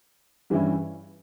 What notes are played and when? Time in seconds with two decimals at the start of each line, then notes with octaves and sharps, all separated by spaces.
0.50 G2 E3 G3 C#4 E4